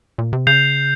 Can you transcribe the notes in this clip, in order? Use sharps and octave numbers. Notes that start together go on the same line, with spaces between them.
A#2
C3
C#3 G6 C7 F7